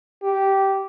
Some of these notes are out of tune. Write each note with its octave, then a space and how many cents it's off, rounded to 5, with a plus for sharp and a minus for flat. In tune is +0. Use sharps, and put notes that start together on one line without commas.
G4 -10